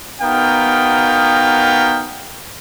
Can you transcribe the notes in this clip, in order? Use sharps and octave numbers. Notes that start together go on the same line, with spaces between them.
B3 D#4 F#4 A#4 F5 G5